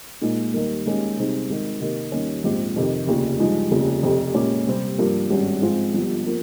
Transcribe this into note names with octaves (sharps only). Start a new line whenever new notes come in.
A#2 G#3 D#4
D#2 D#3 G3 A#3
D#2 D#3 G#3 C#4 G4
C3 G3 C4 D#4 G#4
G#1 G#2 D#3
C3 D#3 A#3
D#2 D#3 G3 C#4
A#1 G#2 F3 C4 G4
F2 C3 D#3
F1 D#2 C#3 F3
G2 F3 G#3 D#4
F1 D#2 C#3 F3
F1 F2 C3
A#2 G#3 C#4 G4
C3 G3 C4
G2 F3 A#3
G#1 G2 G3 C#4
G#2 F3 G#3 C4 F4
G1 G2 F3
F3 A#3